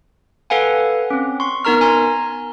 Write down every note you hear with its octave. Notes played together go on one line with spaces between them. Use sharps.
A4 B4 F5 F#5 G#5
C4 C#4
C6 C#6
B3 D#4 A#4 A#5 F6
G#5 A#5 C6